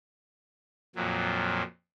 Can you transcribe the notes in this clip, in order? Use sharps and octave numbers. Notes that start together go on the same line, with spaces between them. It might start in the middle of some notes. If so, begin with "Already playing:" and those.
F2 A#2 F#3